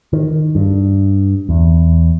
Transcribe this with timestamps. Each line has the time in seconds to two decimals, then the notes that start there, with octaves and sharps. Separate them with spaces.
0.13 D#3
0.55 G2
1.49 E2